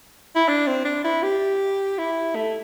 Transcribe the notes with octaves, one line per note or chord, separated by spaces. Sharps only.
E4
D4
C4
D4
E4
G4
E4
A3